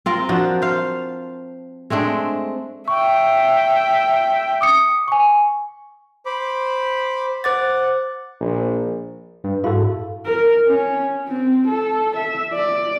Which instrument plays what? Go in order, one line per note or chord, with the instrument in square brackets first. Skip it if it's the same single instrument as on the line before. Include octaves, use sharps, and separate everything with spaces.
[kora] C4 F4 A#4
F3 D4 F#4
C5 F5
G#3 A3 C4 D4
[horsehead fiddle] E5 G5 [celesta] C#6
[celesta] D6 D#6 C#7
G#5 C#6
[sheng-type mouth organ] C5 B5 D6
[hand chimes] C5 D6 A6 [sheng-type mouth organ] F#5
[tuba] A#1
[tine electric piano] G2
[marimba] G#2 F5 [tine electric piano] E4 F#4 A4
[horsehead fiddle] A#4
C#4
C4
A4
E5
D5